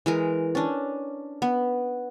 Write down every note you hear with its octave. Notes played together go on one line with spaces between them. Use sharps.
E3 G#3 A#4
C#4 D4
B3